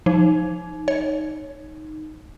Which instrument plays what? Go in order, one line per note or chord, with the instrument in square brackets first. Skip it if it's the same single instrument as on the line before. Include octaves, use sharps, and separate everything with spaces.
[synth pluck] F3 [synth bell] D#4
[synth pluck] C#5